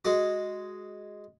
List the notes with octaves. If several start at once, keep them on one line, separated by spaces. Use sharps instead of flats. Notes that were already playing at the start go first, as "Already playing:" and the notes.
G#3 F#4